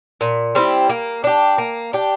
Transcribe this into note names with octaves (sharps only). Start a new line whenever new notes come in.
A#2
G3 C4 E4
A#3
D4 G4
A#3
D4 G4